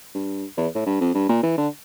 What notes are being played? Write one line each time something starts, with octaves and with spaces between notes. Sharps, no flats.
G2
E2
A2
G2
F2
G2
A#2
E3
D3